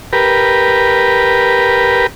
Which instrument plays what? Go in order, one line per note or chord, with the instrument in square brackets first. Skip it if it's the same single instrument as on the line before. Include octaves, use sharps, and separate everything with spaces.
[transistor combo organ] G4 A#4 B4